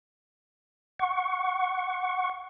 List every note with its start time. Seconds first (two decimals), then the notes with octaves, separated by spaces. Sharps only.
0.99 F#5 C#6